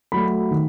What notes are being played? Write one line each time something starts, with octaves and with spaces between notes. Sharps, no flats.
F#3 A3 B5
D#3